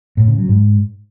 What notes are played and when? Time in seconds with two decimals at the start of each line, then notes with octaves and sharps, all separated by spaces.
0.17 A2
0.28 C#3
0.38 F#3
0.49 G#2